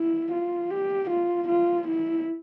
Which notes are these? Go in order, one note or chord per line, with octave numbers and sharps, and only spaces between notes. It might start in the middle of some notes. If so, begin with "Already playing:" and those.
Already playing: E4
F4
G4
F4
F4
E4